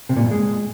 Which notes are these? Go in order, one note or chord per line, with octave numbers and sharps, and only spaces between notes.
C3
A#2
G2
G#3